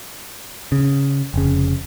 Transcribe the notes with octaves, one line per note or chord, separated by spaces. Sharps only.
C#3
F1 C#3